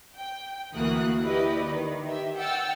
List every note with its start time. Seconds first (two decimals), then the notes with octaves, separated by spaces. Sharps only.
0.17 G5
0.74 D2 E3 A#3 F#4 D#6 F#6
1.21 E4 G4 B4 D5 D#5
1.64 D#3
2.06 G4 E5
2.36 F#5 G5 E6 F6 A6